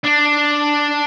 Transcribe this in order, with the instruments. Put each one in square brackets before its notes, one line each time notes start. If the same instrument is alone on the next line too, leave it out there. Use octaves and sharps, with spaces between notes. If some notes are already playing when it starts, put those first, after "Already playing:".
[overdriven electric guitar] D4